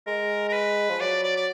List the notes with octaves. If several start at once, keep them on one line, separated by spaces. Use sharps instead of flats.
G#3 A#4
A#4
B4
F3
F#3 D5
D5
D5